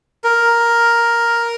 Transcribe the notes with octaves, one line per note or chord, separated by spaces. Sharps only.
A#4